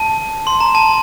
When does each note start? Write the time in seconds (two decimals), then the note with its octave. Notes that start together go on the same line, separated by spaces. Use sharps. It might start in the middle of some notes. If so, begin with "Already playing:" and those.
Already playing: A5
0.47 C6
0.61 A#5
0.75 A5